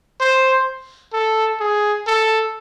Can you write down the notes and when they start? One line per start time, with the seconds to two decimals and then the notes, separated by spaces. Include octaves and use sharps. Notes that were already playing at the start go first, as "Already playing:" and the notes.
0.20 C5
1.13 A4
1.60 G#4
2.07 A4